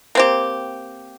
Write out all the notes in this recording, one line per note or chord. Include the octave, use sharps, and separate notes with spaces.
A#3 C4 G4